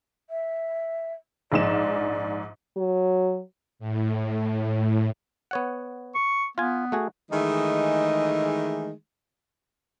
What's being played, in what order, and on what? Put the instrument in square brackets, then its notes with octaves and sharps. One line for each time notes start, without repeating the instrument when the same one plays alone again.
[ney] E5
[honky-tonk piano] A#1 G#2 E7 [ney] D5
[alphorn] F#3
[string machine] A2
[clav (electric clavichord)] B3 C#5 F#5
[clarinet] C#6
[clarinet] B3 [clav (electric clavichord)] F4 G#5
[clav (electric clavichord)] A3 F#4 G#4
[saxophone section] D#3 E3 G#3 A3 D#4 G#4